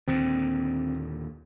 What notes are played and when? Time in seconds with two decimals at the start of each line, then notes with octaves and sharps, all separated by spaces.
0.08 D#2 A#2 D3 C4